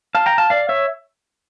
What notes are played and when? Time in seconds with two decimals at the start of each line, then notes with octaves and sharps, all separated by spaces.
0.15 F5 A5
0.26 G5 A#5
0.38 F5 A5
0.50 D5 F5
0.69 C#5 E5